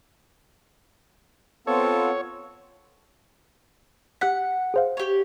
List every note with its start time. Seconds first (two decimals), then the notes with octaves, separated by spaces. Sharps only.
1.67 B3 C4 F4 A4 C#5
4.21 G4 F#5 F#6 B6
4.74 G#4 C5 F5
4.97 G4 C#5